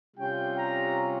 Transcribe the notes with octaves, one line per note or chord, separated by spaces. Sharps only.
C3 G3 C#4 F4 G5
A#5